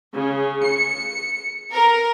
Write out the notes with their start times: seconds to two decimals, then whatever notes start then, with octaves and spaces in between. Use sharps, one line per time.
0.16 C#3
0.67 C#7
1.72 A#4